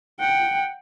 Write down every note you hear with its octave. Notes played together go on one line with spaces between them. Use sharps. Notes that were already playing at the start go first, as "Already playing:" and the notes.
F#5 G5